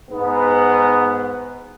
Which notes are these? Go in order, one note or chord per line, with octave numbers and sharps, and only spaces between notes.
G#2 B3